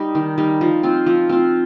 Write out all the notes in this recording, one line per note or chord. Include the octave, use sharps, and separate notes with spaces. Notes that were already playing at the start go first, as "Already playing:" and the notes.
Already playing: G3 D#4
D#3
G3 D#4
F3
C4 F4
F3
C4 F4